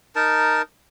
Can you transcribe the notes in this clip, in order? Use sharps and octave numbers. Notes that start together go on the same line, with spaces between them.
D#4 A#4 A5